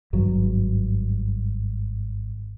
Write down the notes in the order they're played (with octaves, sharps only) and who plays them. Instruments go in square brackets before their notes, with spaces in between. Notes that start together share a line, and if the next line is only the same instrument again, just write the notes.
[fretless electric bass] G#1 G2 F#3